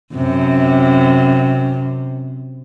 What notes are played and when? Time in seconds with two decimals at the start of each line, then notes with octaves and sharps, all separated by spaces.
0.15 F#2 C3